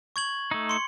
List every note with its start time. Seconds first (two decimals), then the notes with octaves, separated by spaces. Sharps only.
0.16 C#6 G#6 F#7
0.51 A3 D#4
0.69 C6 C#7